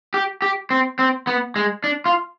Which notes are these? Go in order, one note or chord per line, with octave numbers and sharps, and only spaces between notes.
G4
G4
C4
C4
B3
G#3
D4
F4